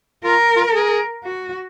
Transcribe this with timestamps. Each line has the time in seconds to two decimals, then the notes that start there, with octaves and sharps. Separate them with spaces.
0.24 F4 A#4
0.57 F4
0.73 G#4
1.24 F#4